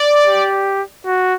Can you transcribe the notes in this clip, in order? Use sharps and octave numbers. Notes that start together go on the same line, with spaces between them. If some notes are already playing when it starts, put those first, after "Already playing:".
Already playing: D5
G4
F#4